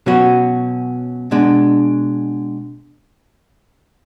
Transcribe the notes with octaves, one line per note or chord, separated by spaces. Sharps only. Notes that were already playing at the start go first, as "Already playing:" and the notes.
B2 F#3 C#4 F#4
B2 G#3 D4